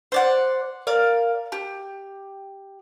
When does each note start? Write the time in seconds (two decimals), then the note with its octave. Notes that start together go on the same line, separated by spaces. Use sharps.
0.12 C5 D5 F#5
0.87 A#4 D5 F5
1.52 G4